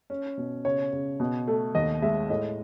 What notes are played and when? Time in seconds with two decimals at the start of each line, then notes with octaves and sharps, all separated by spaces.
0.10 C#4
0.37 B2
0.65 C#3 C#5
0.93 C#3
1.20 B2
1.47 A3
1.75 D#2 D#5
2.02 G#3 E5
2.30 A2 D#5